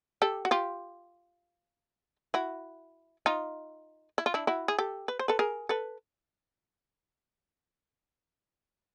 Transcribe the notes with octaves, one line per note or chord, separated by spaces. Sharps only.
G4 A4
F#4
F4 G4
E4 F#4
D#4 F4
E4
F4
D4 E4
E4 F#4
G#4
G4 A4
B4
C5
A4 B4
G#4 A#4
A4 B4